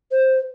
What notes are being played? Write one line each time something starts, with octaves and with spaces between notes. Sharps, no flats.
C5